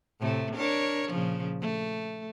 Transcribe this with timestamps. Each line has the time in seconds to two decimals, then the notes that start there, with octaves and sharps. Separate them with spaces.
0.20 A2 C3 A3
0.55 D4 A#4 C#5
1.09 A#2 C#3 F3
1.61 A3